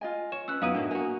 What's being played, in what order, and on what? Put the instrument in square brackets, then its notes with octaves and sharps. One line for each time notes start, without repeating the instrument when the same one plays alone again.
[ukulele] F4 D#5 G#5
[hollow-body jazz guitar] C#5 [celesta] E7
[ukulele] C#4 B4 [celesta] E6 F#6
[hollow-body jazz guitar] F#2 B3 [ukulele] D#4 E4 F#4 [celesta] F5 D#6 D#7
[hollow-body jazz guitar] A2 A#3 [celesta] D4
[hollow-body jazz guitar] A#3 F#4 [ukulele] G#5